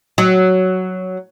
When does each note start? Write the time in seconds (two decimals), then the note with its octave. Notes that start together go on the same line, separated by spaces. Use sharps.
0.18 F#3